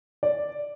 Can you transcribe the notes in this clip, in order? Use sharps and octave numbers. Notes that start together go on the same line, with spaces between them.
D5